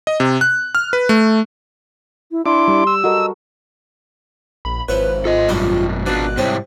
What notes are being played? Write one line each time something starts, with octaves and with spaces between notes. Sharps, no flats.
D#5
C3
F#6
F6
B4
A3
E4
D4 E4 C6 D6
G3
E6
F#4 A4 A#4 D#5
A#1 B5
G#1 F3 E4 B4 C#5
F4 A4 D#5
F#2 B2 G3 D4 E4
B2 D4 F4 D5 F#6
G#2 C3 G3 C4 E4 C#5